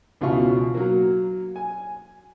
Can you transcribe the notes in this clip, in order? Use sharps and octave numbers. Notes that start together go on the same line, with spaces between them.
C#2 B2 E3 F4 C#6
F#3 A#3
G#5